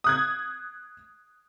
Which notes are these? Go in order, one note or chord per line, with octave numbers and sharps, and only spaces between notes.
D#6 F#6 G#6